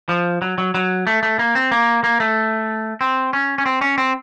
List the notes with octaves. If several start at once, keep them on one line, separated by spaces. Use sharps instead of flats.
F3
F#3
F#3
F#3
A3
A3
A#3
C4
A#3
A#3
A3
C4
C#4
C#4
C4
C#4
C4